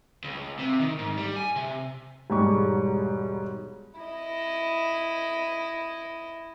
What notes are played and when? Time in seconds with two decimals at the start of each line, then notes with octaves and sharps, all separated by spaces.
0.24 C#2
0.59 C3
0.80 D#3
0.99 G#2
1.17 G3
1.36 G#5
1.56 C3
2.30 E1 G#2 G3 C#6
4.01 E4 D#5